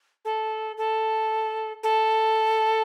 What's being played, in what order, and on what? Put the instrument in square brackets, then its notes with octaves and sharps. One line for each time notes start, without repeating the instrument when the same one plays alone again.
[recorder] A4
A4
A4